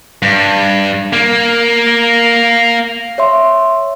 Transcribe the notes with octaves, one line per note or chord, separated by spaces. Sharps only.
G2
A#3
C#5 E5 C6